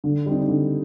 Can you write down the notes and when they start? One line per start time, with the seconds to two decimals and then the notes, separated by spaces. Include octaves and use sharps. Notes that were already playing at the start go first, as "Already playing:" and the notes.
0.04 D3
0.26 G3 C4 D#4
0.48 D3